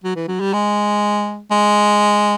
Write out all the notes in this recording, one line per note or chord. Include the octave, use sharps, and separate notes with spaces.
F#3
E3
F#3
G3
G#3
G#3